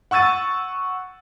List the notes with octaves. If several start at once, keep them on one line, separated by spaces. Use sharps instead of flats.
F#5 C#6 E6 A6 D#7